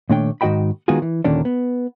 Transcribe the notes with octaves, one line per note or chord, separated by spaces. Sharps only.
A#2 D#3 A3 D4 C#5 G5
G#2 D#3 F#4 D#5 G5 B5
D#3 G#3 B3 F4 F#4 G#4
E3
D#2 A#2 D3 D#3 C#4 D4
B3